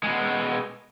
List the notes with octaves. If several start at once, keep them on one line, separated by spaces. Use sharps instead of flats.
B2 G#3